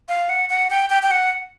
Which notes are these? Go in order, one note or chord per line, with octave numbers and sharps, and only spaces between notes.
F5
F#5
F#5
G5
G5
G5
F#5